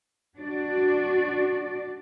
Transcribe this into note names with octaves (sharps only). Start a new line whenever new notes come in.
D4 F#4 D5